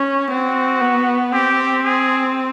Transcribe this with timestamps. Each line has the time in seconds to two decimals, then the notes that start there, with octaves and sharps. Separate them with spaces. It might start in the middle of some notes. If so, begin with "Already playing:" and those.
Already playing: C#4
0.30 C4 F#4
0.81 B3
1.32 C4 G4
1.84 G#4